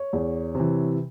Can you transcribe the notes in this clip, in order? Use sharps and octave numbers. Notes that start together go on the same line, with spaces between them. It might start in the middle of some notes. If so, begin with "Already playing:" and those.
Already playing: C#5
E2
C3
E3